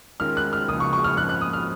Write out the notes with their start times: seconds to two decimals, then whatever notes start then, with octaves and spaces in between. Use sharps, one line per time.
0.20 D#3 G#3 C#4 F4 A#4 F6
0.37 F#6
0.53 F6
0.68 C#2 C#3 F3 A#3 D#6
0.80 C#6
0.93 C#6
1.04 F6
1.17 G#2 F3 A#3 C#4 F#6
1.29 F#6
1.41 D#6
1.53 F6